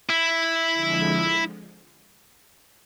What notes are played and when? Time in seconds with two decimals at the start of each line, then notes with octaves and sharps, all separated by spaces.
0.09 E4
0.73 F2 D3 F3 G#3